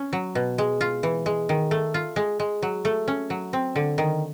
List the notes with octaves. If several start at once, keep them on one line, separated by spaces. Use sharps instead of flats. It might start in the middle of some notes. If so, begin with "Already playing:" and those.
Already playing: C#4
F#3
B2
G#3
F4
E3
G#3
D#3
A3
F4
G#3
G#3
F#3
A3
C#4
F#3
C4
D3
D#3